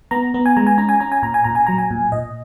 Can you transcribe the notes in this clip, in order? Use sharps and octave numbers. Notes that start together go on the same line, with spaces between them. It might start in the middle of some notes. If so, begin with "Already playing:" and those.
B3 A#5
B3
G#5
G#3 A#5
G#5
C#4 A#5
G#5
C#4 A#5
G#5
A#2 A#5
G#5
A#2 A#5
G#5
F#3 A#5
G#5
A#2
A#2 D#5